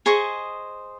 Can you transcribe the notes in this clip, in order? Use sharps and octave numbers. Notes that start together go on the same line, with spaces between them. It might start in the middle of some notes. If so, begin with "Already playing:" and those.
G#4 C5 D#5 C#6